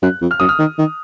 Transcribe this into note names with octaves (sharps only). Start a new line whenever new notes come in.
F#2 F#6
F2
F6
F#2 D#6
F6
D#3
D#3